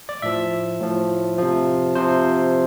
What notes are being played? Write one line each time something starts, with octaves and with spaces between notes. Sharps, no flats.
D5
A2 F3 E5
A2 F3
C3 F3
C3 F3 C5